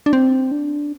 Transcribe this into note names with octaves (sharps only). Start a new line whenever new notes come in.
D4
C4
D4